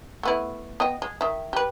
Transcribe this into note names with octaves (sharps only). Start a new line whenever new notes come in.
A3 B3 E4
B3 D#5 G5
G#3
D#3 E5
G4 B4